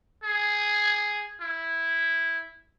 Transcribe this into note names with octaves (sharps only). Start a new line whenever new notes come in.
G#4
E4